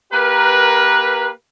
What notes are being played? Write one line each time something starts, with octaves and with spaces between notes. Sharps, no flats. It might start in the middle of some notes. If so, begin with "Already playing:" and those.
A#3 G4 A#4 B4